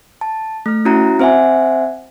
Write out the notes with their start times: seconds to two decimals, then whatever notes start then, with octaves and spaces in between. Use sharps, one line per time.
0.21 A5
0.66 A3 F6
0.85 C#4 E4 F#4 A#5
1.19 C4 C5 E5 F#5 G#5